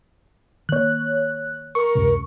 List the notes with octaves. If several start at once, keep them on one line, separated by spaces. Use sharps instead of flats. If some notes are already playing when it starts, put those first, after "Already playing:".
D#3 A#3 C#5 F#6
A#4 C#6
C#2 F#2 C3